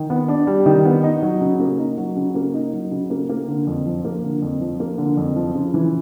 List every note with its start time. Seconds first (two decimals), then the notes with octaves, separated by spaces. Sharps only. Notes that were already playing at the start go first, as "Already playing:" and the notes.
Already playing: D#3
0.10 B3
0.28 D4
0.47 G3
0.66 D#3
0.85 B3
1.03 D#4
1.22 F#3
1.41 C#3
1.60 A#3
1.79 D#4
1.98 F#3
2.16 C#3
2.35 A#3
2.54 D#4
2.73 F#3
2.92 C#3
3.10 A#3
3.29 A#3
3.48 D3
3.67 F2
3.86 F3
4.05 A#3
4.23 D3
4.42 F2
4.61 F3
4.80 A#3
4.98 D3
5.17 F2
5.36 F3
5.55 C#3
5.74 E3